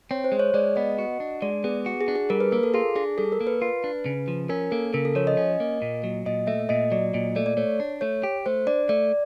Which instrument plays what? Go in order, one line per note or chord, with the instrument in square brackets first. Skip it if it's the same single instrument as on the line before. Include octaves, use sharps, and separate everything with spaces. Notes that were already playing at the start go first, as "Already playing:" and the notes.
[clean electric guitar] C4 [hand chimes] C#5
[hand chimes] C5
[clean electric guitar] G#3
[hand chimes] C#5
[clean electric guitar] G#3 [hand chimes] D5
[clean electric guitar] B3 [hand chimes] D#5
[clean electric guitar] F#4
D4
[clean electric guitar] G#3 [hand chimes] D5
[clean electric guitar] B3 [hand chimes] G#4
[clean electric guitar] F#4
[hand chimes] G#4
[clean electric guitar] D4
[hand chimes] G#4
[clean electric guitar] G3 [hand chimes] A#4
[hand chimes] B4
[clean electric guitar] A#3 [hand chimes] A#4
[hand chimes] A4
[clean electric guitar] F4 [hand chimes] G#4
[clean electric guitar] D4 [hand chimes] G#4
[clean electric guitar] G3 [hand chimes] A4
[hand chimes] A#4
[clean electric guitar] A#3
[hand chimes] B4
[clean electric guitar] F4
D4
C#3
F3
[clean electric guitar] C#4 [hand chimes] A#4
[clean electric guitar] A#3 [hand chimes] A4
[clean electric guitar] C#3 [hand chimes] A#4
[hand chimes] A4
[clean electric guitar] F3 [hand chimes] C#5
[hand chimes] D#5
[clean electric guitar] C#4
A#3
A#2
F#3
[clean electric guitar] A#2 [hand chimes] D#5
[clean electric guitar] A3 [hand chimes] E5
[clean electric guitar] A#2 [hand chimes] D#5
[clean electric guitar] F#3 [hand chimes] D5
[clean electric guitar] A#2 [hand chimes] D#5
[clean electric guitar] A3 [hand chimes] D5
[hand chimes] D5
[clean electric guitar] A3 [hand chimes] C#5
[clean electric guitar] D4
[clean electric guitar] A3 [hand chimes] C#5
[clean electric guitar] G4
[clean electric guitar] A3 [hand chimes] C5
[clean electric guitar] D4 [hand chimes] D5
[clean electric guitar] A3 [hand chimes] D5